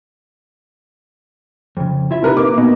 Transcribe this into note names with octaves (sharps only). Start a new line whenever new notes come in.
F2 C#3
E4 F4 E5
C3 A#4 B4
A#3 D6
B2